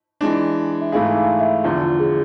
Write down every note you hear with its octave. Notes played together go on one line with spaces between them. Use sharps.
E3 G#3 D4
E5
G#2 E3 A3 E4 G#4 F5
G#5
F5
E5
E2 D3 F3 F4
F4
G#4